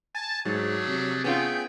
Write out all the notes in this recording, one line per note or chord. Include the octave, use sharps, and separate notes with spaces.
G#5 A5
G#2 F#3 A3 D4 G#4
C3
A3 B3 C#4 F4 G#4 G5